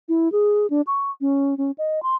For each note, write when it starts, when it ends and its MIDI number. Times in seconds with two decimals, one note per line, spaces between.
0.09 0.31 64
0.32 0.67 68
0.70 0.81 62
0.87 1.11 85
1.21 1.57 61
1.58 1.71 61
1.78 2.02 75
2.03 2.15 84